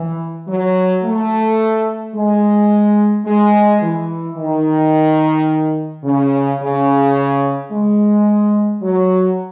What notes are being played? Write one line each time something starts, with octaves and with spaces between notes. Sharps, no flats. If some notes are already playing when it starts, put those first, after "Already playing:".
Already playing: E3
F#3
A3
G#3
G#3
E3
D#3
C#3
C#3
G#3
F#3